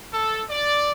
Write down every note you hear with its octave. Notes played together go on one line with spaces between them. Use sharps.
A4
D5